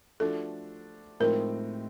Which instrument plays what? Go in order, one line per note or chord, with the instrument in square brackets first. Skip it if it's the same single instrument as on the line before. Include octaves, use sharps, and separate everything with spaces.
[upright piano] F3 A3 D4 F#4 [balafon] A4
[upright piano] A2 F3 G#3 C4 D#4 [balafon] A#4